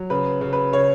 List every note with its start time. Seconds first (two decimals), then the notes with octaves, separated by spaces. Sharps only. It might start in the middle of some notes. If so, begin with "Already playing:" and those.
Already playing: F#3
0.10 C#3 B4
0.41 C#3
0.53 B4
0.73 C#3 C#5